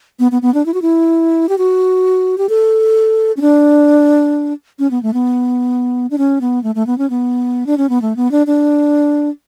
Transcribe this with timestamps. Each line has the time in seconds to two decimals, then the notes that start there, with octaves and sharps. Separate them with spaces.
0.19 B3
0.32 B3
0.42 B3
0.54 D4
0.66 E4
0.74 F#4
0.82 E4
1.49 G4
1.58 F#4
2.38 G4
2.49 A4
3.37 C#4
3.41 D4
4.79 C#4
4.91 B3
5.03 A3
5.14 B3
6.11 D4
6.18 C#4
6.41 B3
6.64 A3
6.75 A3
6.87 B3
6.98 C#4
7.10 B3
7.67 D4
7.78 C#4
7.89 B3
8.02 A3
8.16 B3
8.31 D4
8.47 D4